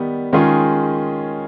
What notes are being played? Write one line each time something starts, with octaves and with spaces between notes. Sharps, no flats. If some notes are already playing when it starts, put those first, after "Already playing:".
Already playing: D#3 G3 B3
D#3 G#3 C#4 F4 G#4